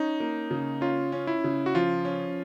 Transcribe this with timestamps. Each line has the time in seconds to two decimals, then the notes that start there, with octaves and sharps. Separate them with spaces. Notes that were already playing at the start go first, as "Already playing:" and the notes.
Already playing: C#4 D#4
0.20 A#3
0.51 C#3
0.81 C#4 F4
1.12 C#4
1.27 E4
1.44 C#3
1.66 F#4
1.75 F3 F4
2.05 C#4